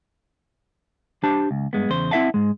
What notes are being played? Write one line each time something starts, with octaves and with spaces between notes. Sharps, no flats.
D4 G4 C5 A5
C#2
G2 G#3 B3
E2 C#3 C5
C4 E4 G4 E5 F#5 A5
G#2 G#3